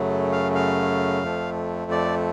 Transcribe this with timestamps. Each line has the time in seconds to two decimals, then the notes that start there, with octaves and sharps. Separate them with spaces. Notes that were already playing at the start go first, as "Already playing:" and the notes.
Already playing: F#2 C#3 F#3 A3
0.32 F5
0.55 F5
1.24 F2 F3 A3
1.91 D5